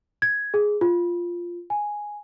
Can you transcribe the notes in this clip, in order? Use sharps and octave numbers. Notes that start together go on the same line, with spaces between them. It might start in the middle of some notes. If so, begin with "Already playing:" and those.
G#6
G#4
F4
G#5